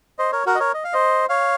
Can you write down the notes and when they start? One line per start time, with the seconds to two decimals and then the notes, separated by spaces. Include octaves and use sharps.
0.19 C5 D#5
0.32 A#4 C#5
0.46 F#4 A#4
0.55 D#5
0.60 A#4 C#5
0.74 D#5
0.84 F5
0.93 C5 D#5
1.29 C#5 F5